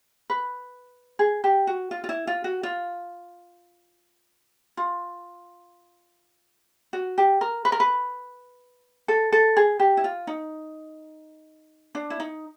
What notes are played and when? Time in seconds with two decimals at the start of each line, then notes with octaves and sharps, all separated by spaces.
0.30 B4
1.19 G#4
1.44 G4
1.67 F#4
1.91 F4
2.04 F4
2.09 E4
2.27 F4
2.44 F#4
2.63 F4
4.77 F4
6.93 F#4
7.18 G4
7.41 A#4
7.65 B4
7.72 A#4
7.80 B4
9.08 A4
9.32 A4
9.57 G#4
9.80 G4
9.97 E4
10.04 F4
10.27 D#4
11.95 D4
12.10 E4
12.20 D#4